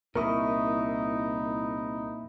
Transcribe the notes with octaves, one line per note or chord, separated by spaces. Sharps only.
C2 A#2 D#4 E4 A#4 C#6 D#6